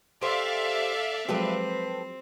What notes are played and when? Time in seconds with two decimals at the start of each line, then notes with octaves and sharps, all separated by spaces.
0.21 G4 A4 C5 D5 E5 F5
1.29 F3 F#3 G#3 C4 G4 A4 B4